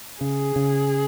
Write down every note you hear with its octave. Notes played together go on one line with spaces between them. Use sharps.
C#3 G#4
C#3